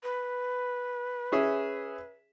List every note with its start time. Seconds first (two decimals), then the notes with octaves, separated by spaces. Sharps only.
0.03 B4
1.32 C#4 G#4 E5